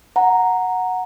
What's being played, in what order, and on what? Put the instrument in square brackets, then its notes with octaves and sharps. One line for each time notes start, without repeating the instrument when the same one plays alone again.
[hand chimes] F#5 A#5